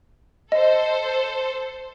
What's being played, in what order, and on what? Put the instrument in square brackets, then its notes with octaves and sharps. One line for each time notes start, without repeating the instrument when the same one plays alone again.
[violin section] A4 C5 [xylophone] D#5